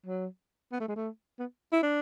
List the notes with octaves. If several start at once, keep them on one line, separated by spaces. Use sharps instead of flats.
F#3
B3
A3
G#3
A3
B3
E4
D4